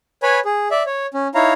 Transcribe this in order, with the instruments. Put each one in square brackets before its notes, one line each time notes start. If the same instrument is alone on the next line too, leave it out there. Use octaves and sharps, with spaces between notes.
[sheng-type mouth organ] B4 C#5 G#5 B5
G#4
D5 E5
C#5
C#4
D#4 E4 C#5 F5 A#5